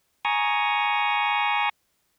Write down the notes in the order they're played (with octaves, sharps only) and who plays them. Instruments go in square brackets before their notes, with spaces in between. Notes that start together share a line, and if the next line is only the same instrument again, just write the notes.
[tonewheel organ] G#5 A#5 C#6 D#6